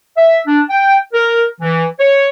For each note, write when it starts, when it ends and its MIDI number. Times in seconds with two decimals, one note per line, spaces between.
0.18 0.39 76
0.48 0.61 62
0.70 0.97 79
1.13 1.44 70
1.61 1.86 52
2.00 2.28 73